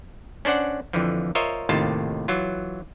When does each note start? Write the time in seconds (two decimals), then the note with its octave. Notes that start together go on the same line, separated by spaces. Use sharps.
0.45 C#4 D4 C5 D5 F#5
0.93 F2 D3 E3 F3
1.35 F4 A#4 C5 C#5 D#5 E5
1.69 D#2 A2 C3 D#3 F4 A5
2.28 E3 F#3 F4